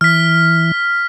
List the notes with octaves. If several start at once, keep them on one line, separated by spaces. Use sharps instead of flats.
E3 F6 B6